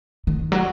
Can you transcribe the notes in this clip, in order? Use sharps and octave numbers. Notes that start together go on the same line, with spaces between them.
D#3
F#3